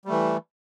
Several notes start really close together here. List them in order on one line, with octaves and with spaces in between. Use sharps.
G3 A3 E3